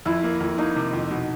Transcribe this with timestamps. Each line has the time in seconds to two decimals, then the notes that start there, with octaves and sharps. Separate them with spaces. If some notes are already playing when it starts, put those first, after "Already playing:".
0.06 F2 E4
0.23 A#3
0.40 F2
0.58 A#3 D#4
0.76 C3
0.93 F2
1.11 B2